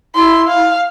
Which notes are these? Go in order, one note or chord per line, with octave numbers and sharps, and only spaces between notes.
E4 C6
F5